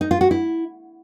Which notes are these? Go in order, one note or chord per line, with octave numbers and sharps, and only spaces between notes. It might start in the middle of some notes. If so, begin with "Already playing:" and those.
D#4
F4
F#4
E4